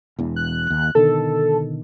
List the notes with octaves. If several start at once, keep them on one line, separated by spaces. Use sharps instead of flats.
E1 E2
F#6
D#2
B2 D3 D#3 A4